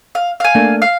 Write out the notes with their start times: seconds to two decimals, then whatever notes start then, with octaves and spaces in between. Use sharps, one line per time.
0.15 F5
0.40 F5 G#5
0.55 A3 A#3 D4
0.82 F5